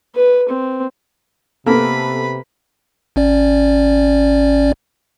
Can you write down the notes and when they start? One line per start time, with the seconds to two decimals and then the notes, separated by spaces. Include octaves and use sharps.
0.15 B4
0.49 C4
1.66 C3 A#3 B3 A4 B4 B5
3.16 G#1 C#4 D5